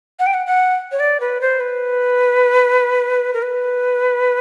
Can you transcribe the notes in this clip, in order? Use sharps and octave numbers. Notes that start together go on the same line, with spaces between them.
F#5
G5
F#5
F#5
C#5
D5
B4
C5
B4
A#4
B4